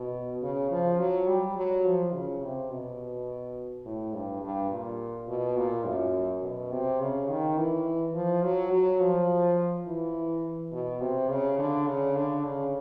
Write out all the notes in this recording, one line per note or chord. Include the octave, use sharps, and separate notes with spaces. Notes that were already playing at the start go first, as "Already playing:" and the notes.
Already playing: B2
C#3
F3
F#3
G3
F#3
F3
C#3
C3
B2
A2
G2
G2
A#2
B2
A#2
F#2
B2
C3
C#3
D#3
E3
F3
F#3
F#3
F3
E3
B2
C3
C#3
D3
C#3
D3
C#3